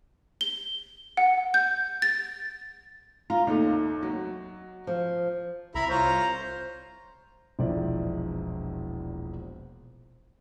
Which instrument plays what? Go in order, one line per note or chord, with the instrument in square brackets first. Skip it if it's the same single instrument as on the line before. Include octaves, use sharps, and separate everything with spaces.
[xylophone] G7
F#5
G6
A6
[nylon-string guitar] F4 [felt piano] A#5
[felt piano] D#2 A3 [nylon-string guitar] D#4
[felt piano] F#3
[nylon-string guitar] F3
[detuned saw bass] C2 [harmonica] E4 [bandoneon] E5 A#5 B5
[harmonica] F4 C#5 A#5 [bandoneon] C5
[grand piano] E1 A#1 E2 E4 D5